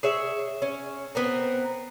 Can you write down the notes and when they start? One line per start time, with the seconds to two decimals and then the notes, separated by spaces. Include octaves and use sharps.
0.03 G#4 C#5 E5
0.62 C#4
1.15 B3 C4 A#4